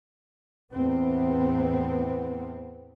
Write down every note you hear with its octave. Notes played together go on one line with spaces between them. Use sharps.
E2 A2 B3 C4